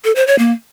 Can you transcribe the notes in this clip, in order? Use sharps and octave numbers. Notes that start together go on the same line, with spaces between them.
A4
C5
C#5
A#3